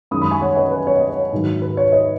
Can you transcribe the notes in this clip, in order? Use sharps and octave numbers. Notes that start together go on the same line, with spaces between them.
F#2 D#3 G#3 B5 D#6
B5 D#6
G#5 C#6
C#5 F#5
B4 D#5
B4
C#5
D#5
C#5
G#2 D#3 F#3
B4
C#5
B4 D#5